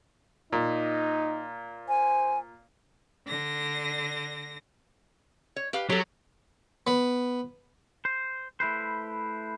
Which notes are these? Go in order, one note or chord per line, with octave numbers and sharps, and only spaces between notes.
A#2 D#4
C5 G#5
D3 A#6
C#5
G4 B4 F5
F#3 G4 A4
B3
C5
A3 E4 B4 C5